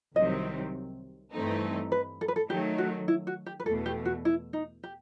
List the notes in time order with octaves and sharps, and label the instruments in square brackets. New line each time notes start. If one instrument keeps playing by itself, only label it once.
[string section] C2 C3 D#3 F#3 C4 [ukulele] D#5
[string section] G2 E3 A3 C4 D#4
[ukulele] B4
A4
B4
A4
[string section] D#3 F#3 A3 [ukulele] G4
[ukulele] F#4
E4
F#4
G4
B4
[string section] E2 B2 A3 [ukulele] A4
[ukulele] G4
F#4
E4
D#4
G4